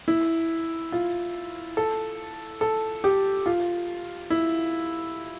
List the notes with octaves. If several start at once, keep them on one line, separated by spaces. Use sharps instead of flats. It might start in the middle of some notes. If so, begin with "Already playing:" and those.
E4
F4
A4
A4
G4
F4
E4